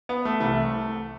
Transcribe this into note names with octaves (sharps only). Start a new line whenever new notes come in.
B3
A3
C2 C3 E3 A3